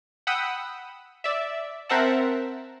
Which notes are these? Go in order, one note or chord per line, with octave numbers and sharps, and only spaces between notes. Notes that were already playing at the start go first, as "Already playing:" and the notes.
F#5 G5 B5 D#6 E6
D5 E5
C4 A#4 C5 E5 F#5 A5